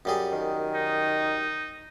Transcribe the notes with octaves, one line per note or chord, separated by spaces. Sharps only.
F#2 G3 G#4
D#3
D#4